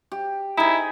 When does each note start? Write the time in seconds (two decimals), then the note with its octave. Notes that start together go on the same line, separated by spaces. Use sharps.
0.12 G4
0.57 D#4 E4 G#4